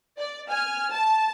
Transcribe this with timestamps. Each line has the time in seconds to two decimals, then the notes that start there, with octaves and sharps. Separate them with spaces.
0.18 D5
0.50 G#5 F6
0.92 A5